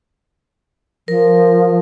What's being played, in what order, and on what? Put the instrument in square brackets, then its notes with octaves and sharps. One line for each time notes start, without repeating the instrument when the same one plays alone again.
[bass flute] F3 [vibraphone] A#4